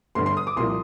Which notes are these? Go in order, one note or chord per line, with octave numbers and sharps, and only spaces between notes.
G1 G2 D3 C6
C6
D#6
D6
C2 A#2 F3 C6